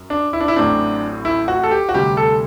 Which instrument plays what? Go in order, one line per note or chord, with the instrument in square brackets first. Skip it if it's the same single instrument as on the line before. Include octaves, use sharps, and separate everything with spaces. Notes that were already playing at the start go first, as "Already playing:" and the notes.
Already playing: [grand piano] F#2 F#3
D4
E4
D4
E4
A1 A2 F#3 C4 D4
E4
F#4
A4
G4
F#4
D2 C3 G3 G4
A4